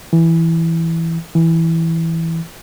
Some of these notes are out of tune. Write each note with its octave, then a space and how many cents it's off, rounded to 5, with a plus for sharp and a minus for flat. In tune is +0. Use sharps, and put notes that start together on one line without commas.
E3 +0
E3 -5